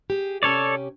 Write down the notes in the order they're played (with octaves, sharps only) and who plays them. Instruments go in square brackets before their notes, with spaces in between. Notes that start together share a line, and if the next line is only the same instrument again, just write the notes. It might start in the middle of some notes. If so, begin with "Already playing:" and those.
[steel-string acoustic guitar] G4 G#4
[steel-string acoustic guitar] C3 C#4 G4 [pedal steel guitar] A4 C#5 D5